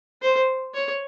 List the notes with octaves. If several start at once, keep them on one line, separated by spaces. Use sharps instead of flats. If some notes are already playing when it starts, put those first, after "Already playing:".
C5
C#5